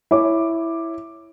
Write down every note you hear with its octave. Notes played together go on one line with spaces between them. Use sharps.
E4 C#5 D6